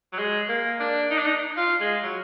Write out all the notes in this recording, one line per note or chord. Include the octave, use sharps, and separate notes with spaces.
F#3
G#3
A#3
D4
D#4
D4
D#4
F4
G#3
F#3